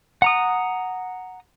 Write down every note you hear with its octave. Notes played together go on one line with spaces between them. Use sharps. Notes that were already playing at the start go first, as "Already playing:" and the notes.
F#5 A#5 D#6